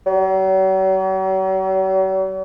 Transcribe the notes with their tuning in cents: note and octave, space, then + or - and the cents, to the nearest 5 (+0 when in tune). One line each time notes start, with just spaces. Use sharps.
F#3 +45